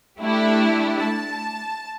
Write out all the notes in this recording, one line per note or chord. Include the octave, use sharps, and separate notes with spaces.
A3 D4 E4 G4
A5